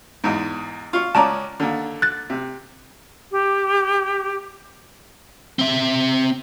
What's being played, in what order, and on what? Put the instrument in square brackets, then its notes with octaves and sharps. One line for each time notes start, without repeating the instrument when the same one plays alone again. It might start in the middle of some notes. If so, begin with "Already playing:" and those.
[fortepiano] E2 G#2
F4 C#6
[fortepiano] C#2 C#4 D5 [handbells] A5 A#5
[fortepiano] D#2 D3
[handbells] F#6 A6
[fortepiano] C3
[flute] G4
[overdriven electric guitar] C4 E5